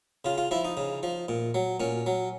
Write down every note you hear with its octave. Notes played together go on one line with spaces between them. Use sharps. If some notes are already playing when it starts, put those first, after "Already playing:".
C#3 F4
F4
F3 E4
D#4
C#3
F3
A#2
F#3
A#2 C#4
F#3